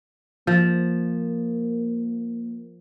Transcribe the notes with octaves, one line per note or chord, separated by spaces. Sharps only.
F3 A#3